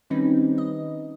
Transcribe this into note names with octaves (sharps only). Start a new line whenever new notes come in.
D#3 G3 C4 C#4 D#4 B4
D#5